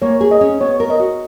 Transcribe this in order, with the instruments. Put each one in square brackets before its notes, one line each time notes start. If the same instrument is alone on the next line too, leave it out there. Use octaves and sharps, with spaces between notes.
[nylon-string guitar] A#3 [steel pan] C#5
[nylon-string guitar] G#4
[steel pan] D#5
[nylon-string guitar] C#4
[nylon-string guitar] B3 [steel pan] C#5
[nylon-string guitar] A#4
[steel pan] D#5
[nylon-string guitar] F#4